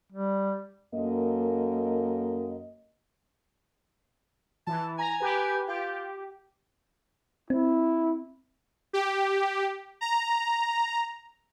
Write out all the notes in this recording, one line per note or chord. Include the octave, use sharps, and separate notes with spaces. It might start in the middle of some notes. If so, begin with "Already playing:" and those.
G3
F#2 A#3 A4 D#5
E3 A5
G#5 A#5
G4 B4
F4 G4
C4 E4
G4
A#5